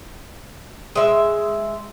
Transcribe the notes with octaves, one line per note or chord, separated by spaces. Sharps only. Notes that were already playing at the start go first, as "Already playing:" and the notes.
G#3 E5